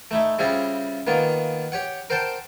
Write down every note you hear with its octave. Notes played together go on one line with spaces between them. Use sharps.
A3 D#4 E4
C#3 G3 C4 E4 F4 G#4
D#3 A#3 B3 F4
G4 C#5 F#5
A#4 C5 F#5 G5 A5